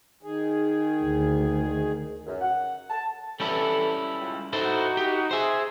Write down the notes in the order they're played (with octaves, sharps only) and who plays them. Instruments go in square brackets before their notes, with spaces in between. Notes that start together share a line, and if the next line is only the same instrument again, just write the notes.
[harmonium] D#3 G#4
[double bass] D2
[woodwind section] F#2
F#5
A5
[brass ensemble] E3 A4 [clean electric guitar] G3 C#4 E4
[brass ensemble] C#2
[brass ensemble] D#4 F#4 [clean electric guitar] E4 A4 C5
[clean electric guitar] G4
[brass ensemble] G#4 [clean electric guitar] C5 E5